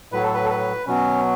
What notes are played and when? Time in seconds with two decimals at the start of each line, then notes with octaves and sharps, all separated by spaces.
0.12 A2 F#3 B4
0.23 A4
0.34 B4
0.45 A4
0.49 B4
0.87 B2 F#3 C#4